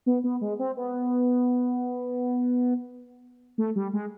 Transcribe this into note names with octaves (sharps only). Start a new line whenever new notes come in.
B3
B3
G#3
C4
B3
A3
G3
G#3